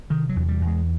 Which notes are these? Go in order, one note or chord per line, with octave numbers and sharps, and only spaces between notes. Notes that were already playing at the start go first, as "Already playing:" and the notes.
C3 D#3
F#3
E2
G3
E2
G#3